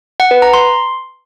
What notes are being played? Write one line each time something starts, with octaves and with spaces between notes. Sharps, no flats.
F#5
B4
A#5
C6